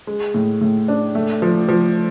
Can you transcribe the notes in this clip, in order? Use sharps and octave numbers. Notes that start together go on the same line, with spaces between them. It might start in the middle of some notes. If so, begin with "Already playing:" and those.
G#3
A2
A2
D4
A3
F3
F3